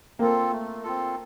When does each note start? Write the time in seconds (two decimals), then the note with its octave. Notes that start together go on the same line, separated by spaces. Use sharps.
0.19 A#3 C4 F4 A4
0.51 A3
0.84 C4 F4 A4